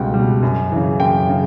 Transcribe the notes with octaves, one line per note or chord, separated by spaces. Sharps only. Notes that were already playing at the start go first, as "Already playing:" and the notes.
Already playing: C#2 B2 G3 F#5 G5
G3
B2
F#2
C#3 E3
F#2 G5
C#3